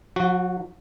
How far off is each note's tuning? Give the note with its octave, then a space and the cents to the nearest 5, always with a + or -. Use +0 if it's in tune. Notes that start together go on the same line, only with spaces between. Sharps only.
F#3 -45 F#4 +0